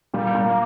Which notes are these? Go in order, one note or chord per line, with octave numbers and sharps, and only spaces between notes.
A#2 G3
A#2
A#3